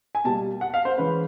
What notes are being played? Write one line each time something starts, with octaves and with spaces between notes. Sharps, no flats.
G#5
B2 G3 A#3 A5
F#5
F5
C5
E3 G#3 C#4 B4